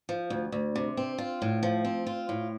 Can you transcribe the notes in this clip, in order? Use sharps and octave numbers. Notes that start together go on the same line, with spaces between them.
F3
D2
D2
C3
C4
F4
A2
F3
C4
F4
A2